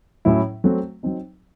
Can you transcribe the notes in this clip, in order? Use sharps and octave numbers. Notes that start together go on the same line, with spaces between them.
A2 F#3 C#4 E4
F#3 A3 C4 F#4
F#3 C4 D#4